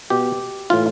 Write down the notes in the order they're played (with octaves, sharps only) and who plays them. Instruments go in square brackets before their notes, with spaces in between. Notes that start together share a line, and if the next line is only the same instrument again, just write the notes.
[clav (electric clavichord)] B2 G4
A2 E3 F4